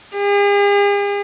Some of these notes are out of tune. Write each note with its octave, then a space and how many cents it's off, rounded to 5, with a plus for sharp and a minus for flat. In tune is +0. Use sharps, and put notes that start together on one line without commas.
G#4 -45